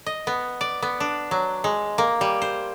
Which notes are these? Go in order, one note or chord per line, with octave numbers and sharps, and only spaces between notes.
D#5
B3
D5
B3
D4
F#3
G#3
A#3
G3
C5